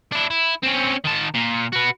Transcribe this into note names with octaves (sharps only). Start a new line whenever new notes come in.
D4 E4
E4
C4 C#4
D#3 A5
A#2
F#4 B4